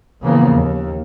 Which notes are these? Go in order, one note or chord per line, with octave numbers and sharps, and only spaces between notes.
A#2 C#3 E3 F3 A#3 B3
D#2